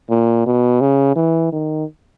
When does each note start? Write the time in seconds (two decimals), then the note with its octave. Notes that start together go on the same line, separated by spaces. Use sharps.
0.10 A#2
0.46 B2
0.81 C#3
1.16 E3
1.53 D#3